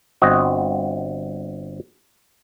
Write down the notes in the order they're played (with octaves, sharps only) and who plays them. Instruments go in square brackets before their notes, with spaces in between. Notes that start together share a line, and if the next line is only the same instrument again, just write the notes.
[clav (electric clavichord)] G1 C4 F#4 D#5